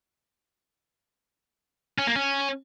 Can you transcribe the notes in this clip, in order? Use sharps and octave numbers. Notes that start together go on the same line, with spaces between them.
C#4
A#3
C#4